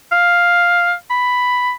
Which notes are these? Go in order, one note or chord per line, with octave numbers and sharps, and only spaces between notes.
F5
B5